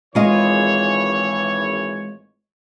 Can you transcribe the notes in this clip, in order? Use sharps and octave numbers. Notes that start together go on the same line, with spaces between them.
G#1 E3 G#3 F4 C#5 D#5